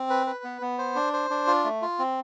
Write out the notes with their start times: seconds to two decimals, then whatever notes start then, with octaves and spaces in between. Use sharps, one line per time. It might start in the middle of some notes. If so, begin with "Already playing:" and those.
Already playing: C4
0.10 B4
0.27 B4
0.44 B3
0.62 B3
0.78 C5
0.96 D4
1.13 C5
1.30 D4
1.47 F4
1.65 A3
1.82 F4
1.99 C4